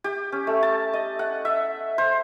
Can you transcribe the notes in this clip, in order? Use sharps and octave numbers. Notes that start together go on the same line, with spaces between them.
G4
C#4
A3
A5
D#5
F#5
E5
C5